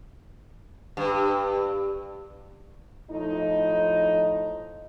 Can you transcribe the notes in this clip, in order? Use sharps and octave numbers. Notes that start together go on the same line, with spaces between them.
G2
A2 F3 D#4